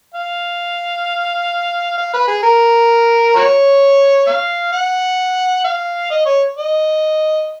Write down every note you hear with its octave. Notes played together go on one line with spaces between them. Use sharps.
F5
F5
B4
G#4
A#4
F#4 A#4 C#5
F5
F#5
F5
D#5
C#5
D#5